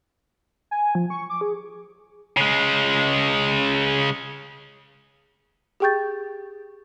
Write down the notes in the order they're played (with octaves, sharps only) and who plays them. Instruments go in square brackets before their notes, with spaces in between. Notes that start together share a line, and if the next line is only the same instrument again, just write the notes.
[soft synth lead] G#5
F3
C#6
D6
G#4
[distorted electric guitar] C#3 G#3
[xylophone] G4 G#4 G5 C#6 G6 A6